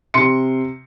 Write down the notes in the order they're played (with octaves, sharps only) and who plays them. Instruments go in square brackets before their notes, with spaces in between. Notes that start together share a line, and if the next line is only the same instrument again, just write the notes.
[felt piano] C3 C6 C#7